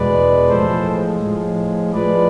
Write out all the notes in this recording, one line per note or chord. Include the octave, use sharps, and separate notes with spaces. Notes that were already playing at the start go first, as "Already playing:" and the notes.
Already playing: E2 B2 G#3 B4 D5
A2 F3 G#3 A4 C5
A2 F3 G#3
A2 F3 G#3 B4 D5